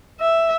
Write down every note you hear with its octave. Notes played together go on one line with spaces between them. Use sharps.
E5